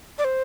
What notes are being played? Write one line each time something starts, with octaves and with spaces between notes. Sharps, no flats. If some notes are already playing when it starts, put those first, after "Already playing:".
D5
C5